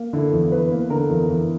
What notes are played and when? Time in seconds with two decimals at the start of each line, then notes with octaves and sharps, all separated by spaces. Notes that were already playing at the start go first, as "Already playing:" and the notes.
Already playing: A#3
0.13 D3 E4
0.32 E2
0.51 E2 B4
0.71 A#3
0.90 D3 A#4
1.10 E2
1.29 E2